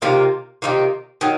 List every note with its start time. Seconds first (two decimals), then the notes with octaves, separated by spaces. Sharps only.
0.02 C3 D#3 A#3 F4
0.62 C3 D#3 A#3 F4
1.21 D#3 F#3